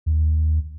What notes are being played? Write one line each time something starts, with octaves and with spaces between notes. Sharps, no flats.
D#2